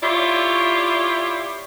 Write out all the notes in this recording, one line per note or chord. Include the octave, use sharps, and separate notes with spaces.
E4 F4 G4 C#5 D5 E5